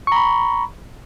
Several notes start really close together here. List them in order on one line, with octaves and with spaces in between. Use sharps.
C#6 A#5 B5